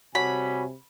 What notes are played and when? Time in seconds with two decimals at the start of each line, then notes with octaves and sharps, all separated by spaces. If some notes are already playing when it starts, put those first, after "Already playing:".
0.15 C3 G3 F#4 C#5 G#5 B5